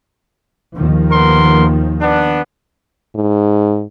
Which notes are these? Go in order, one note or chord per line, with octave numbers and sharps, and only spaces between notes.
D#2 D#3 F3
B3 A#4 C6
B3 D4
G#2